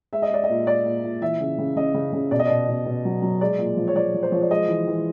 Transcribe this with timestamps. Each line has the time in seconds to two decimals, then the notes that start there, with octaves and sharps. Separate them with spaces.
0.13 G#3 E5
0.22 D#5
0.30 G#3 D5
0.44 D#5
0.49 A#2
0.67 G#3 D5
0.86 A#2
1.04 A#2
1.22 E3 E5
1.40 C#3
1.58 C#3
1.76 C#3 D#5
1.94 C#3
2.13 C#3
2.31 B2 D5
2.39 D#5
2.46 B2 D5
2.68 B2
2.86 B2
3.05 F#3
3.22 F#3
3.41 G#3 D5
3.59 A#2
3.77 F3
3.88 C#5
3.95 F3 D5
4.14 F3
4.23 C5
4.32 F3 C#5
4.41 D5
4.50 G#3 D#5
4.68 E3
4.87 E3